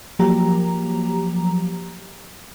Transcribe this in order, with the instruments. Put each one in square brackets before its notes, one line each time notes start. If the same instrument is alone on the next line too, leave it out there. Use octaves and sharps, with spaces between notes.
[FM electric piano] F3 F#3 A#3 G4 A#5